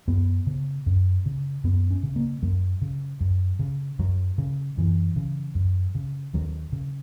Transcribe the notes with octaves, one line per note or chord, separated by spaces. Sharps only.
F#2 B3
C#3
F#2
C#3
F#2 B3
C#4
C#3
A#3
F#2 F#3
C#3
F#2
C#3
F#2 F#3
C#3
F#2 E3
C#3
F#2
C#3
D#2 F#3
C#3